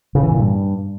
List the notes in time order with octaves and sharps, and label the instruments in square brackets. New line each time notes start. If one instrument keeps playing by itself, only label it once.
[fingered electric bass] C#3
E3
A#2
G2